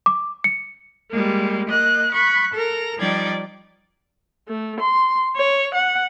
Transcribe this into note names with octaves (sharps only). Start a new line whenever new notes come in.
D6
C#7
G3 G#3 A#3
A#3 D#5 F#6
B5 C#6 F#6
A4 A#4 A#5
F3 G3 D#4 D5 G5 G#6
A3
C6
C#5
F#5